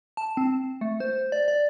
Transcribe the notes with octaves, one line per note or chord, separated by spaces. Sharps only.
A5
C4
A3
C5
D5
D5